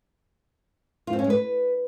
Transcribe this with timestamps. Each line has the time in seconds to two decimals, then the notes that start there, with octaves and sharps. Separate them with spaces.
1.07 F4
1.13 C4
1.19 C#4
1.24 G#3
1.30 B4